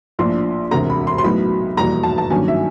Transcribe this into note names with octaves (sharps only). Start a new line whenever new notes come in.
A#1 A2 F3 A#3 D4 C6
E1 D2 C3 A#5
B5
C6
C6
B1 A2 F#3 B3 B5
F1 E2 B2 G3 A#3 A#5
A5
A5
G2 D#3 F#3 A#3 C#4 G#5
E5